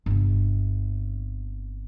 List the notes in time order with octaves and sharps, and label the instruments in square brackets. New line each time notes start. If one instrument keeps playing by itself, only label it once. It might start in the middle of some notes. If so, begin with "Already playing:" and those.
[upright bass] G1 C3